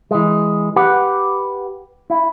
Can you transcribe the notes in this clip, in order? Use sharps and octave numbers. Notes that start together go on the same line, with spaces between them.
E3 G#3
G4 B4 F#5
E4